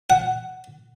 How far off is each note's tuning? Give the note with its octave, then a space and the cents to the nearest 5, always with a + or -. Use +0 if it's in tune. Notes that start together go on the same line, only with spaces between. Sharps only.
F#5 +10